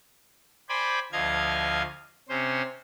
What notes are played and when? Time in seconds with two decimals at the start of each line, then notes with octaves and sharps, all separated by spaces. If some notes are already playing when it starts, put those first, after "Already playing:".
0.69 C5 D5 G5 G#5 B5
1.12 D2 F3 D#5 F5 G#6
2.29 C3 C#4 C5